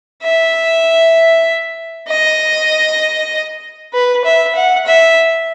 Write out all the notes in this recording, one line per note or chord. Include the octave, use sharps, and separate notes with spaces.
E5
D#5
B4
E5
F#5
E5